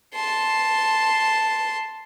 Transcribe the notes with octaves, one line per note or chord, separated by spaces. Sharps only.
A5 C6